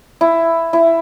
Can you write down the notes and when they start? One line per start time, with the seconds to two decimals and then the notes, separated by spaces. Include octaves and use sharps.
0.21 E4
0.73 E4